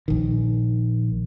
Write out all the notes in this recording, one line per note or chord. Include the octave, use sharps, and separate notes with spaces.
A#1 D#3